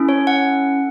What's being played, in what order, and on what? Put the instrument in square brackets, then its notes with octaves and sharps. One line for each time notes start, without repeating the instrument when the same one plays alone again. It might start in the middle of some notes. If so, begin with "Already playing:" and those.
Already playing: [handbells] C#4 E4 A4
C#5
F#5